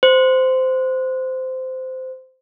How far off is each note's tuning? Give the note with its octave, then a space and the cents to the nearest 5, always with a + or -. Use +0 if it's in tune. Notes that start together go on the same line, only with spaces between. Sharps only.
C5 -15